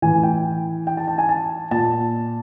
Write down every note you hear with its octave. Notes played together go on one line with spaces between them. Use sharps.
A2 E3 G#5
G5
G5
A5
A5
G#5
A5
A#2 A5